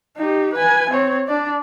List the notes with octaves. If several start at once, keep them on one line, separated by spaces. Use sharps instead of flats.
D#4 G4
B4 G#5
C4 C#5
D4 D5